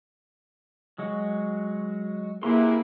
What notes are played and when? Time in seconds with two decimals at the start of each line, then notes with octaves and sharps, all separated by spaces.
0.98 F#3 G#3 F#4
2.43 C3 A#3 E4 G#4 B4 A#5 C6